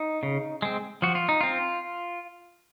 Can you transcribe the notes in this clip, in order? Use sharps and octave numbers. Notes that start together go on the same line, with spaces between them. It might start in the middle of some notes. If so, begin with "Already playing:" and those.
Already playing: D#4
C#3
G#3 C4
F3 F#4
F4
D#4
C4 F4